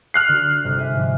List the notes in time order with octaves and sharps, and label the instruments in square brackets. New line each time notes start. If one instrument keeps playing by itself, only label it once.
[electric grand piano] F6 F#6 C7
[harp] D3 F#4
G1 C3
G4 G#4 E5
G#2 F3